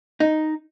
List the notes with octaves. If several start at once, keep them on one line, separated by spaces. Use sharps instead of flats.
D#4